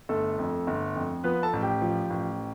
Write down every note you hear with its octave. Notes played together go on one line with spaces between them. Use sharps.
G1 A3 A4
F2
G1
F2
F3 B3 B4
A4 A5
A1
G4 G5
F3
A1